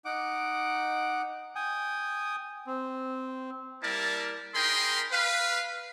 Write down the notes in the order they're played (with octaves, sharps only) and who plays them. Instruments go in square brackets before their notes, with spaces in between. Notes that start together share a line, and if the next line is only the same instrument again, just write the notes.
[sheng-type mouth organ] D#4 F#5 D6
[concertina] G5 G#5 D#6
C4
[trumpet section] G3 A#3 E4 A#4 D5 A5
D#4 G#4 A#4 G5 B5 C6
B4 F5